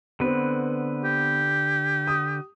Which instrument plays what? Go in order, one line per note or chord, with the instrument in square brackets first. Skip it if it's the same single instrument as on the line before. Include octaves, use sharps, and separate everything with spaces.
[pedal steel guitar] D3 B4 [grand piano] B3 C4
[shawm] G4
[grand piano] D#6